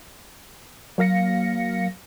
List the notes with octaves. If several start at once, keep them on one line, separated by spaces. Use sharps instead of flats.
F#3 A#3 F5 A#6 C#7